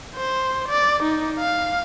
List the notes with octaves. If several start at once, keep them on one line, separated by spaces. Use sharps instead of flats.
C5
D5
D#4
F5